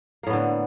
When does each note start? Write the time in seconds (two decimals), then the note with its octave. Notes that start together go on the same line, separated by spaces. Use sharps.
0.23 A#3
0.27 A2
0.30 B3
0.33 D3